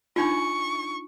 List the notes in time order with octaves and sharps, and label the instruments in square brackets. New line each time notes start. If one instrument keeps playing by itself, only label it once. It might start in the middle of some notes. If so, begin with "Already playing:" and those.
[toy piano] D4 D#4 F4 [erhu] C#6